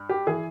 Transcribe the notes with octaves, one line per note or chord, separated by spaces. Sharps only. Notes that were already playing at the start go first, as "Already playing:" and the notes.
Already playing: G2
G4
E3 G#4